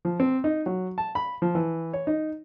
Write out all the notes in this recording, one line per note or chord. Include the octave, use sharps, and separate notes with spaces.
F3
C4
D#4
F#3
A5
B5
F3
E3
C#5
D#4